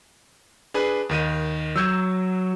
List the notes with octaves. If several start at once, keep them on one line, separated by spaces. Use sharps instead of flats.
D4 G#4 B4
D#2 D#3 D#7
F#3 E6 G6 G#6